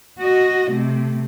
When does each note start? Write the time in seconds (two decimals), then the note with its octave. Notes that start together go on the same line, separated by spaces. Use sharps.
0.19 F#4 D#5
0.70 C3 A3